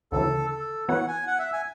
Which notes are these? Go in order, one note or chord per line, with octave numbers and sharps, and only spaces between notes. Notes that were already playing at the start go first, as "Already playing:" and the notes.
D2 C#3 E3 A4
A4
E3 B3 F#4 C#5 F#5
G#5
F#5
E5
G#5